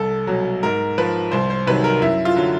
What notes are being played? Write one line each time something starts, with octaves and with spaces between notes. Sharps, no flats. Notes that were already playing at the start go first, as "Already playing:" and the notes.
Already playing: C2 A4
B2 F#3
G#2 A#4
F3 B4
C2 C5
C5
C3 D#3 F#3 B4
A#4
F#2 E4
F4
D3 F#3